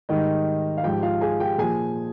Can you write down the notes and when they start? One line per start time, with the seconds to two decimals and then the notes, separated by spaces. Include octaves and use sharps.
0.09 G#2 D#3 G3 D#4 D#5
0.77 F5
0.84 G#2 F3 G4 G5
1.02 F4 F5
1.21 G#4 G#5
1.40 G4 G5
1.58 A#2 F3 G#4 G#5